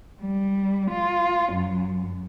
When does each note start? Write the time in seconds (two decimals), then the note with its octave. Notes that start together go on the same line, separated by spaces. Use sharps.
0.22 G3
0.91 F4
1.53 F#2